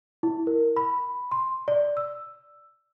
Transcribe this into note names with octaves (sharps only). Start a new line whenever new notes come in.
E4
A#4
B5
C6
D5
E6